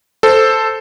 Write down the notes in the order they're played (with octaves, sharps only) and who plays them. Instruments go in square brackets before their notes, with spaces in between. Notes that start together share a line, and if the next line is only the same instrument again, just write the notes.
[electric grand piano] A4 C5